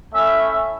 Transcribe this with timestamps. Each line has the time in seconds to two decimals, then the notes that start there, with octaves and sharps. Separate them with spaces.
0.12 A3 C#4 E4 E5